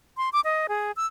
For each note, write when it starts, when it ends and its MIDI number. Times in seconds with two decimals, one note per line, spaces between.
0.17 0.29 84
0.33 0.40 86
0.44 0.67 75
0.69 0.92 68
0.96 1.06 88